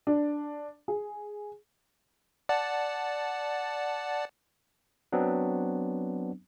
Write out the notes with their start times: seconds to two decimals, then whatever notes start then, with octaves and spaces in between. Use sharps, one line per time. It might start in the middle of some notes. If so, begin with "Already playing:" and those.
0.07 D4
0.88 G#4
2.49 D5 F#5 A5
5.12 F#3 B3 C4 D4